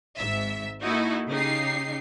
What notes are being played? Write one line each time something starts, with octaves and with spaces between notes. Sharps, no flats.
G#1 G#2 E5
A#3 D#4 E4 F#4 A4
C#3 D#4 G4 C7